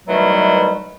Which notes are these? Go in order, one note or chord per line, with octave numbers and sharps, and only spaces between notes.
B2 D#3 E3 F#3 G3 A3